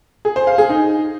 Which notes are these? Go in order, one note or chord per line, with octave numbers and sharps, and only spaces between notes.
G#4
C5
F5
G#4
D#4